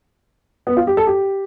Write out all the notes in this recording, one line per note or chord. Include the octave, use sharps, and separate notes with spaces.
B3
F4
G4
A4
G4